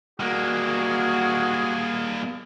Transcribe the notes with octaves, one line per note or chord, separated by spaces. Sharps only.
G3 A#3 F#4 G#4